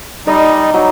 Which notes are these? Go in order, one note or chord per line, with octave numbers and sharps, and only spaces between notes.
G3 D#4 D5 D#5
F#3 D#4